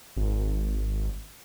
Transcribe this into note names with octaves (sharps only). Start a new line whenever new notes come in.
G#1